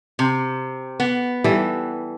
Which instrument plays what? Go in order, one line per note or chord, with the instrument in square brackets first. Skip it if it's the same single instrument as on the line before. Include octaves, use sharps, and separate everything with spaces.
[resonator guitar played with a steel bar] C3
B3
[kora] E3 G3 A4